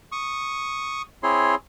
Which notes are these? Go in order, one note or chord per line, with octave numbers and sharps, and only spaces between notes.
C#6 D#6
C4 E4 G#4 C#5 C6